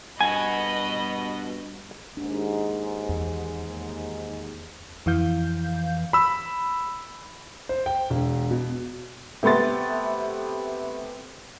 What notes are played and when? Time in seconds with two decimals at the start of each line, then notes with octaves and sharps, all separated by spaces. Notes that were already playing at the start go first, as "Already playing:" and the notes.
0.21 G2 B3 F#4 D#5 G#5 B5
2.17 D#2 G#2 D4
3.09 E2
5.06 F2 E3 F5 G6
6.13 B5 E6
7.69 C5
7.86 G5
8.10 E1
8.51 B2
9.43 C3 A3 B3 C6 A6